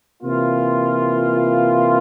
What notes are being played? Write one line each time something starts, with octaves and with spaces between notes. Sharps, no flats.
C3 E3 A#3 F4